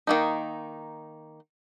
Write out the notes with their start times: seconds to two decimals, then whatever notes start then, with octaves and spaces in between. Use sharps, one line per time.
0.07 D#3 A#3 D#4